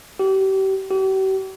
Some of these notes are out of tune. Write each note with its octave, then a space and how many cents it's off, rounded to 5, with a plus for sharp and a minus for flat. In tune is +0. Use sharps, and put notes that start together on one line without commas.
G4 -35
G4 -45